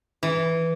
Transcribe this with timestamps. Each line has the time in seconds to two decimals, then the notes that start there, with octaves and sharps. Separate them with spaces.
0.23 E3